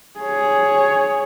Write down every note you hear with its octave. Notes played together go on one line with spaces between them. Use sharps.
G#4 C#5